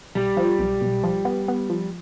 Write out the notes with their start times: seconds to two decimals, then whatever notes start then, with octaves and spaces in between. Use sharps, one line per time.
0.15 B1 G3
0.37 F3
0.59 B1
0.81 B1
1.04 F3
1.25 B3
1.48 B3
1.70 F3